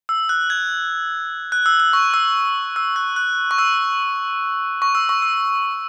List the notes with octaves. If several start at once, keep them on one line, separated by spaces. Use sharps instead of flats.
E6
F#6
G#6
F#6
E6
E6
C#6
E6
E6
F#6
F#6
C#6
E6
C#6
E6
C#6
E6